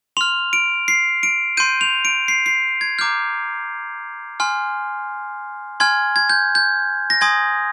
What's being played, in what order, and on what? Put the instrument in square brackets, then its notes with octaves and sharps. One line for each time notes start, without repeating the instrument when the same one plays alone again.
[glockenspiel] C6 F6 F7
D7
C7
D7
C6 G6 D#7
F7
D7
C7
C7
G#6
A#5 D6 F6 G6
G#5 C6 F6
G#5 C6 F6 G#6
G#6
G6
G6
A#6
G#5 C6 D#6 G#6